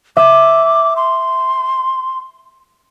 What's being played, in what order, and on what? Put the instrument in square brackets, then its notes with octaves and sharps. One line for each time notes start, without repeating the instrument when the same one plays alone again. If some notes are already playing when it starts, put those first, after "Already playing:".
[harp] E5 [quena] D6
[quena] C6